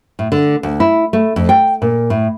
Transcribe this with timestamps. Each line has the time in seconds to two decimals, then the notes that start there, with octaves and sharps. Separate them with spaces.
0.19 A2
0.32 D3
0.63 D2
0.80 E4
1.13 A3
1.36 F2
1.49 G5
1.82 A#2
2.10 A2